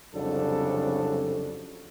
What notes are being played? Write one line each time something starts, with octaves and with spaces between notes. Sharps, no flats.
C2 F2 C#3 F#3 D4 A4